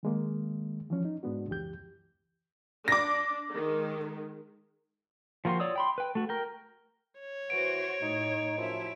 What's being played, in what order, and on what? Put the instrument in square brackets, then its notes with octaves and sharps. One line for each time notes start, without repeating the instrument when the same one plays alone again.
[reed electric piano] D#3 G#3 A#3
E3 F3 C#4
D#4
G#2 G#3 B3 D4 F#4
C#2 F#2 E3 G4 G6
[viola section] D4 [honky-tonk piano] D6 A#6
[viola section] D#3 G#3
[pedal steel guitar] F3 A#3 F#4 G4 C6
F4 C#5 D5 D#6 E6
G5 B5 C6
B4 G5
A3 F#4
A#4 G5
[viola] C#5
[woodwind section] E3 [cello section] F#4 C5 [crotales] D7
[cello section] A2 [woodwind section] D#4
[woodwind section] F#2 F3 [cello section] E4 E5